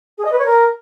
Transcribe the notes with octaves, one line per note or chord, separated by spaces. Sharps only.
G#4
D#5
B4
C#5
A#4